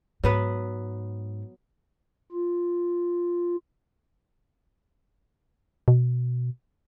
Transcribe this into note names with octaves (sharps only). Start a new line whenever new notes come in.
G#2 F#3 B3 B4
F4
B2